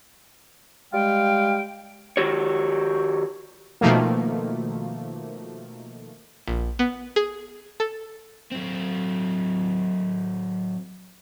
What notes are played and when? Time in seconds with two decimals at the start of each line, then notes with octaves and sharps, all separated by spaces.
0.93 G3 G#3 F5 G5
2.17 D#3 F#4 G4 C#5
3.81 B2 D#3 F3 A3 A#3
6.48 A#1
6.79 B3
7.16 G#4
7.80 A4
8.51 F#3 C4